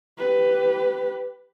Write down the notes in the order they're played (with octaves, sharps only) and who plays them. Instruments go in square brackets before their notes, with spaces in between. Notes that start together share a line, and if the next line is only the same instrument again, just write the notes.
[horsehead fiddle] G4 B4